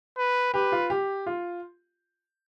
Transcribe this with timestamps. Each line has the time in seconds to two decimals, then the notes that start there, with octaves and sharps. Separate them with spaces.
0.18 B4
0.53 G4 B4
0.72 F4
0.90 G4
1.26 F4